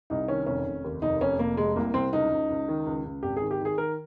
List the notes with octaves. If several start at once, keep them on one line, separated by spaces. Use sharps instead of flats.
C2 D#4
D#3 C#4
F1 C#4
F1
D#2
F1 D#4
F1 C#4
F1 A#3
C3 G#3
C2 A#3
C2 C4
C#2 D#4
C#2
C#2
D#3
C#2
C#2
G#1 G4
G#4
D#3
G4
D#3 G#4
D#3 A#4